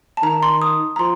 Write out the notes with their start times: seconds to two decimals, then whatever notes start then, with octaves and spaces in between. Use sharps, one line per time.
0.17 A5
0.23 D#3 A#5
0.43 C6
0.62 D#6
0.96 A#5
0.99 F3 C6